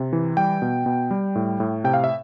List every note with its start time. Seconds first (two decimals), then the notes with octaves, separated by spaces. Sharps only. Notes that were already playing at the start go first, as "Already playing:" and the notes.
Already playing: C3
0.13 E3
0.37 G3 G5
0.62 B2
0.86 B2
1.11 G3
1.35 A2
1.60 A2
1.84 C3 G5
1.94 F5
2.04 E5